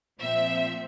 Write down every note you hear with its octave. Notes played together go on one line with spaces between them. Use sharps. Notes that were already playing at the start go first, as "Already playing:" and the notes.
A#2 F3 C4 E5